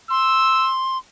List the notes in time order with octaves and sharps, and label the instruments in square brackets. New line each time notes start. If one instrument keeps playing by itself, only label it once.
[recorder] C6 [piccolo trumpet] E6